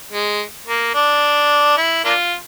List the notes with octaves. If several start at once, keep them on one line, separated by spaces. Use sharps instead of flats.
G#3
A#3
D4
E4
A#3 D4 F4